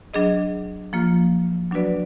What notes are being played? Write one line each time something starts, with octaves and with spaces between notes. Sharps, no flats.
F#3 D4 G#4 D#5
F3 A#3 F4
F#3 D4 F#4 B4 D5